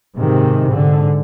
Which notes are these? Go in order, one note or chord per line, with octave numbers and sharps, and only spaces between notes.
G#2 C3 D#3
G#2 D3